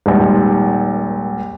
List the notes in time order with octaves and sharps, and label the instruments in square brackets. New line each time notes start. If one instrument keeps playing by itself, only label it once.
[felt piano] D#1 G#1